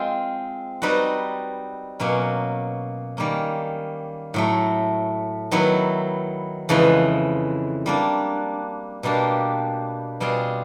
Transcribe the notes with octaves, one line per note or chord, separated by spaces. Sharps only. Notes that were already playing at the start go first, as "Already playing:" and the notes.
Already playing: G#3 C4 F4
G3 C4 D#4 F#4 B4
B2 F#3 A#3 C#4
D#3 G3 A#3 C#4
A2 F#3 A3
D#3 F#3 B3 E4
F2 C#3 E3 G#3
G3 A#3 D4
B2 G3 A#3 D4 G4
B2 G3 C4 F4 G#4